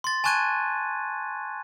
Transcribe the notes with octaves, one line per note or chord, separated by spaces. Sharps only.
C6 A6
G#5 A5 C#6 F#6 G#6 D#7